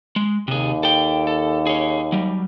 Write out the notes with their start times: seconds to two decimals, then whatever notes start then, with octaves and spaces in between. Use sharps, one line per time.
0.16 G#3
0.48 D#2 C3 G#4
0.83 A4 G5
1.27 A4
1.67 G#4 C#5
2.12 F#3 G3